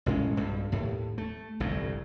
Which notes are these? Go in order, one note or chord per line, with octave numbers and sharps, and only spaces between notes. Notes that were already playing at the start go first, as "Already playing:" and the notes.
A1 A2 G#3 C#4
B1 G2
D#2 A2
A3
G1 C2 F2 A2